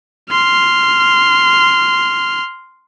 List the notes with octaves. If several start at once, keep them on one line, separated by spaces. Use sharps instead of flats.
C6 F6